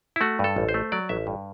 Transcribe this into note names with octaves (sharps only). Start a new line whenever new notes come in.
E4
A3 F#4
G2 A4
A1
C5
A3
F#3 D5
A1 E5
G2